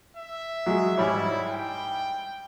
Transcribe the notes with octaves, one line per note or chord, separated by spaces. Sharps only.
E5
F#3 G#3
G#2 G3 E4 C#5
G5